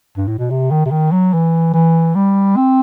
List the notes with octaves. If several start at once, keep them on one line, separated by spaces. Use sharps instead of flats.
G2
A2
B2
C3
D#3
C3
D#3
F#3
E3
E3
G3
C4